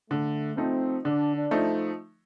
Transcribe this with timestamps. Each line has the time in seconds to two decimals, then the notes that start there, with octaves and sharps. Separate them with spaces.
0.11 D3 A3
0.57 F3 A3 C4 D#4
1.05 D3 D4
1.36 D4
1.51 F3 A3 D#4